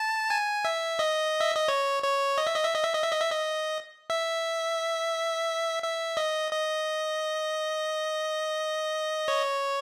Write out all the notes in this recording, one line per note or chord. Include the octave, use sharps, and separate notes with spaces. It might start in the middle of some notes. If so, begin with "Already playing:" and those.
Already playing: A5
G#5
E5
D#5
E5
D#5
C#5
C#5
D#5
E5
D#5
E5
D#5
E5
D#5
E5
D#5
E5
D#5
E5
E5
D#5
D#5
C#5